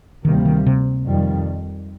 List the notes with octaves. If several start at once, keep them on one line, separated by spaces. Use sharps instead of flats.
D2 C3 D#3 G3 A#3
D#3
C3
F2 D#3 G3